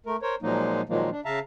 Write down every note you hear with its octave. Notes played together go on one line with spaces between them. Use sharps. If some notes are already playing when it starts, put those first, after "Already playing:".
A3 A#4
A#4 C5 C#5
A#2 F3 F#3 G#3 A#3 D#4
A#2 D#3 F3 F#3 G#3 A#3
D4
C#3 E5 F5 A5 A#5